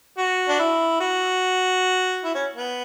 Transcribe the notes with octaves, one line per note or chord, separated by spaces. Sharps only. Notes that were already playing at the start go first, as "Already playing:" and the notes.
F#4
D4
E4
F#4
E4
C#4
B3